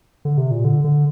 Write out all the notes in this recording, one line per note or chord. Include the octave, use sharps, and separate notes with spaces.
D3
C3
A#2
D3
D3